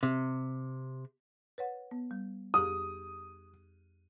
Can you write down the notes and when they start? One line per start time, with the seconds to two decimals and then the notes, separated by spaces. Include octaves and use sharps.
0.03 C3
1.58 B4 C#5 F#5
1.91 B3
2.11 G3
2.54 F2 G4 G#4 D#6